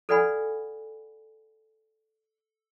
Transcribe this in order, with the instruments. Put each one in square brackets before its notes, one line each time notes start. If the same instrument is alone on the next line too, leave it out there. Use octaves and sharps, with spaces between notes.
[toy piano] A4 B4 D5 F#5 G#5 B5